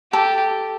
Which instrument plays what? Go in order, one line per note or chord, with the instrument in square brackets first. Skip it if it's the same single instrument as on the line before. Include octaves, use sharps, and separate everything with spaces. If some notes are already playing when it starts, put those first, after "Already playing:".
[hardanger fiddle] G4 [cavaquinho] A4